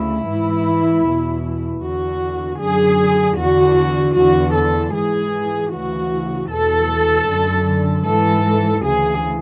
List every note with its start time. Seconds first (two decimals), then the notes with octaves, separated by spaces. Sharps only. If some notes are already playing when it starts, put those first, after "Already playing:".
Already playing: D2 C#3 E4
0.25 G#2 E3
1.04 E2 B2
1.81 E2 D3 F#4
2.59 F#2 D3 G#4
3.37 E2 D3 F#4
4.16 E2 D3 F#4
4.54 A4
4.93 G#2 E3 G#4
5.71 D2 C#3 E3 F#4
6.49 E2 B2 A4
7.27 F#2 D3
8.05 G#2 E3 A4
8.83 D2 C#3 E3 G#4